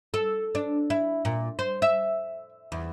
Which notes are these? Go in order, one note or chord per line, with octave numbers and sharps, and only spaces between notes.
A4
D4
E4
A#2
C5
E5
E2